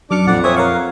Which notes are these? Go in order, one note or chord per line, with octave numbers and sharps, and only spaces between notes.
F#2 D4 D6 F6 C#7
A#1 F2 D5 F#5
C4 C#5 E5 G#5 D#6
A#4 C#5 F5 F#5